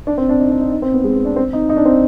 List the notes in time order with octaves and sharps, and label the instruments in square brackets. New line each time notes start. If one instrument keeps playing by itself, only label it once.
[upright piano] D4
C4
D4
D#4
D4
D#4
D#4
C4
B3
G#3
B3
D4
C4
D#4
D#4
D4
C4